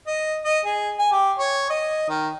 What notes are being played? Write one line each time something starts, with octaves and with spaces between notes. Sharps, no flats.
D#5
D#5
G#4
G#5
G4
C#5
D#5
D#3